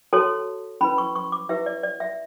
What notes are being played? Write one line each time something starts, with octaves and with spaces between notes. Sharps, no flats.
F#4 A4 C#5 A5
C#4 E4 B4 B5
C#6
C#6
D6
E4 G4 B4 E5
D5
D5
E5